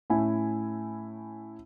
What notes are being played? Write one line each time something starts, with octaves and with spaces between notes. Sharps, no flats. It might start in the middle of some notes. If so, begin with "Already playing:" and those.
A2 C#4 E4 G#5